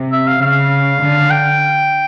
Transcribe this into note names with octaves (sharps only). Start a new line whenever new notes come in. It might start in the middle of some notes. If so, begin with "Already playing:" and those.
Already playing: C3
E5
F5
C#3 F5
D3
G5